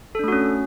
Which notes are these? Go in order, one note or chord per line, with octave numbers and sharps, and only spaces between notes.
A3 C#4 D4 F#4 A4